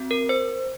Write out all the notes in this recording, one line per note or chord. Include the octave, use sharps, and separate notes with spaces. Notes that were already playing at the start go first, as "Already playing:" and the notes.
Already playing: C4 F#4
A#4
C5